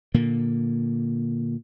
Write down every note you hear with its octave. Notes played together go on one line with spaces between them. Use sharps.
A#2 D3 A#3